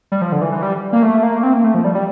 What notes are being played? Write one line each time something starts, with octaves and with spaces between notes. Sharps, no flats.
G3
F3
D3
E3
E3
G3
A#3
A3
A#3
C4
A#3
A3
F3
G3
G3